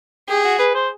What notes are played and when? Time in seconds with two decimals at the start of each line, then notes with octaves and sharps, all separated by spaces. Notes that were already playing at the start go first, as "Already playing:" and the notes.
0.29 G4 G#4
0.44 F#4
0.59 B4
0.75 C5